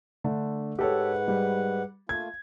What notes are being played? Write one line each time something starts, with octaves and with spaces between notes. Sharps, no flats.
D3 A3 D4
G#2 G4 A4 B4 C#5 F#5
G3
A3 A#3 F4 G#6